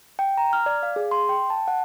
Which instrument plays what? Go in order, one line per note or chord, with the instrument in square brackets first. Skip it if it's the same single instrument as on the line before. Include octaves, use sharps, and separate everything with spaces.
[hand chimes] G5
A#5
F6
D5
F5
G#4
C6
G5
A5
F#5